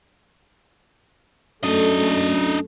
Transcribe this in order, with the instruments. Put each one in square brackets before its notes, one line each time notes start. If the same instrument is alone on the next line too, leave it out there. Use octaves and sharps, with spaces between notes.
[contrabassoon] F#2 [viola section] A3 [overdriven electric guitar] D4 D#5